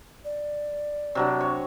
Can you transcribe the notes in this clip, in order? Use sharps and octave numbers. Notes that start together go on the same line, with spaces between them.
D5
C3 F#3 D4
C#5